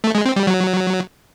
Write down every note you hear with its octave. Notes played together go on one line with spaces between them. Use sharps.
A3
G#3
C4
G3
F#3